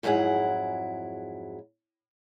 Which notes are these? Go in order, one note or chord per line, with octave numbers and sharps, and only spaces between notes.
F2 G#2 F#3 E4 G#4 F#5